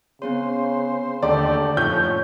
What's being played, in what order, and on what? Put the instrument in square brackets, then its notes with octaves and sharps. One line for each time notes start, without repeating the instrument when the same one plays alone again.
[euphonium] C#3 [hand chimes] B3 C4 C#5 [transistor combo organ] C5
[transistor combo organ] D#2 A3 G4 [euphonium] D3 [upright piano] D5 [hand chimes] A#5
[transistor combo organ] F2 A2 C#4 [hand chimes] D#4 F4 C#5 [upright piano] G6